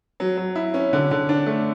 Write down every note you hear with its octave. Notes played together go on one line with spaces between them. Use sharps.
F#3
F#3
E4
C#4
D3
D3
D4
A3